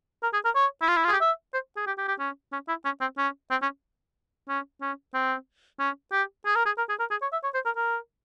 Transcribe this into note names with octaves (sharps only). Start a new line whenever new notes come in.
A#4
G#4
A#4
C#5
E4
F4
E4
F4
G#4
G4
E5
C5
G#4
G4
G4
G4
C#4
C#4
E4
C#4
C4
C#4
C4
C#4
C#4
C#4
C4
C#4
G4
G#4
A#4
G#4
A#4
G#4
A#4
G#4
C#5
E5
C#5
C5
A#4
A#4